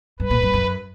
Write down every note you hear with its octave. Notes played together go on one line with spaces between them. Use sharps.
G2 B4
A#2
F#2
F#2